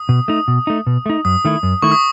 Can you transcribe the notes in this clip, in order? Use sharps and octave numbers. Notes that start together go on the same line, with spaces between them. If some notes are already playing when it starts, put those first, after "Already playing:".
Already playing: D#6
B2
A3 D#4
B2
A3 D#4
B2
A3 D#4
F#2 D#6
D#3 A3 E4
F#2
D#3 A3 E4 C#6
D#6